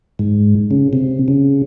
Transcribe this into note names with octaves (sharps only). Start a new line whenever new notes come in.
G#2
C#3
C3
C#3